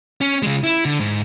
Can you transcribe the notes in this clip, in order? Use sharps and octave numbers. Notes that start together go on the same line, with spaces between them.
C#4
C#3 G#3
E4
D3
G#2